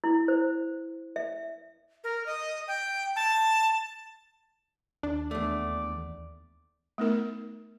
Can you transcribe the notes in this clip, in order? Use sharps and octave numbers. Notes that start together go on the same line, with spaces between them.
E4
C5
E5
A#4
D#5
G5
A5
D#2 D4
E2 A3 D5
A3 B3 D#4 A#4